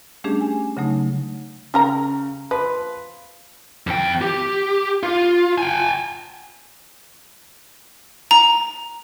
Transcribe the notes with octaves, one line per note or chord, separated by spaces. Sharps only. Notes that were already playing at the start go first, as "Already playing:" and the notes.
G3 A3 C#4 D4 G4 G#4
G#5
C#3 F#3 A3 D#4
C#3 G3 A#4 A#5
F3 B4
F2 G5
G4
F4
G5 G#5
A#5